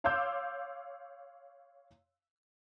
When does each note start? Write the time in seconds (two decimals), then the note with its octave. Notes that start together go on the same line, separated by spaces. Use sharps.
0.04 C#5 F5 C6 D6 E6 G6